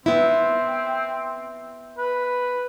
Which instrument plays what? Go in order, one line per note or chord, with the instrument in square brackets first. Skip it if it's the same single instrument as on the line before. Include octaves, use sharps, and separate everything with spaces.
[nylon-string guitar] B3 E4 [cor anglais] C4
[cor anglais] B4